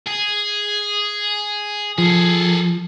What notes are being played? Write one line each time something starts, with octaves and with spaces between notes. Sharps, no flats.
G#4
F3 G#4 A4